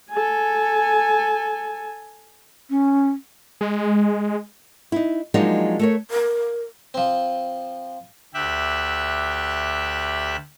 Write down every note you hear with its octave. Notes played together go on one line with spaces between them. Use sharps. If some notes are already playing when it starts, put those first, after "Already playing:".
A4 G#5
C#4
G#3
D#4 E4
F3 F#3 G#3 A#3 D4 D#4
A3 A#4 C#5
A#4
F3 C4
D2 G4 E5 F#6